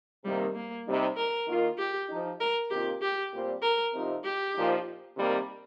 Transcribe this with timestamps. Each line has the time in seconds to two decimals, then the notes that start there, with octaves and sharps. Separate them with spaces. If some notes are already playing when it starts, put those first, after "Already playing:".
0.24 C3 D#3 G3 A#3
0.55 A#3
0.86 C3 G3 D#4
1.17 A#4
1.47 D#3 A#3 F4
1.78 G4
2.08 F3 D#4
2.40 A#4
2.70 C3 D#3 A#3 F4 G4
3.02 G4
3.32 A#2 G3 C4
3.62 A#4
3.93 C3 F3 D#4
4.24 G4
4.54 A#2 F3 D#4
5.17 C3 D#3 G3 A#3